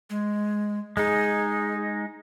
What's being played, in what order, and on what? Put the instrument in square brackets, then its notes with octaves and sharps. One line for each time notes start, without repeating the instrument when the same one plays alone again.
[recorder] G#3
[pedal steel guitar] G#3 D#4 [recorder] G#4